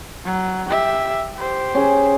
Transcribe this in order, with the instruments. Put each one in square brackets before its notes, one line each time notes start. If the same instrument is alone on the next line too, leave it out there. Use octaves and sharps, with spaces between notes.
[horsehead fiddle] F#3
G4 E5
G4 C5
[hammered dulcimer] C#4 G#4